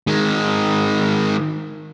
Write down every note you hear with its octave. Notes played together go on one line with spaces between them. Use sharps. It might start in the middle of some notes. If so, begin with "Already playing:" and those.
D#3 G#3